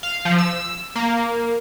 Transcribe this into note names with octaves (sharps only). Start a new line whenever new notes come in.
F5
F3
E6
A#3